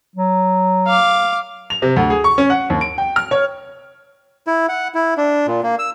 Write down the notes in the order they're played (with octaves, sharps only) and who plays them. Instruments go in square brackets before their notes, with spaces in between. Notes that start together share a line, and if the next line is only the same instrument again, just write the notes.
[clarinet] F#3
[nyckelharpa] F5 D6
[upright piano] F7
C3
D2
G#4
C#6
C#4
F#5
D#2
D7
G5
F6
C#5
[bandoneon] E4
F#5
E4
D4
A#2
A#3
E6